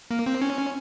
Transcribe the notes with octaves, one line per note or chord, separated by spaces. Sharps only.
A#3
C4
C#4